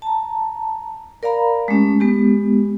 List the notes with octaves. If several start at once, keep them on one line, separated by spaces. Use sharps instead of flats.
A5 A#5
A#4 D5 F5 A#5 B5
G#3 A3 C#4 G4
G#3 B3 G4